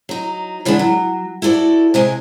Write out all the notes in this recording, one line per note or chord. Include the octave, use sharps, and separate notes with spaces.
F#3 D#4
C#3 E3 G3 G#3 B3 D4
F#3
E4 F#4 A4 C#5 D5
C3 G#3 G#4